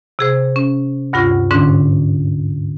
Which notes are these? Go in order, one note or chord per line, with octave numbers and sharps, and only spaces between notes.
C3 G#4 C5
C#4
D2 G2 C3 F4 F#5 C#6
G#2 D3 C#4 D4